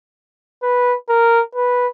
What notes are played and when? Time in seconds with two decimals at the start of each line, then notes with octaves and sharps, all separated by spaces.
0.63 B4
1.09 A#4
1.55 B4